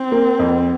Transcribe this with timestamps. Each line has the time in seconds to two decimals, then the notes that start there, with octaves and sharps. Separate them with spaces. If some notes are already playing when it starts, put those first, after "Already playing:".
Already playing: C4
0.11 A#3
0.39 F2